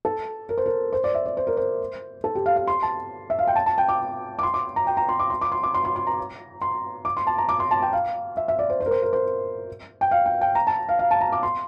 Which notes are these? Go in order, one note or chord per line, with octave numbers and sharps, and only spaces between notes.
A4
A#4
C5
A#4
C5
D5
E5
D5
C5
A#4
C5
A4
G4
F5
F5
C6
A5
E5
F5
G5
A5
A5
G5
D6
D6
C6
D6
A#5
G5
A#5
C6
D6
C6
D6
C6
D6
C6
C6
C6
A#5
C6
D6
C6
A5
A#5
D6
C6
A5
G5
F5
E5
E5
D5
C5
C5
A#4
C5
A#4
C5
G5
F5
G5
G5
A#5
A5
F5
F5
A5
A#5
D6
C6